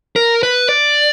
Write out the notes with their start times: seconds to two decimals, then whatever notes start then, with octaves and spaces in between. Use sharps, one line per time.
0.16 A#4
0.43 B4
0.69 D5